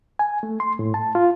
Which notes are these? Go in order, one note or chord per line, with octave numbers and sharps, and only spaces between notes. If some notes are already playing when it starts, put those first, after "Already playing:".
G#5
A3
C6
A2
A5
F4